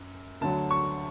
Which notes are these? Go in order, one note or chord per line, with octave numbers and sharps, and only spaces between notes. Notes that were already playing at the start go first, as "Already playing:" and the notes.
Already playing: F#2
D2 D3 F#3 A5
C#6